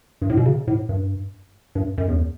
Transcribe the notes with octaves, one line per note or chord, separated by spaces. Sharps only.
G2
A2
B2
C#3
A2
G2
G2
F#2
E2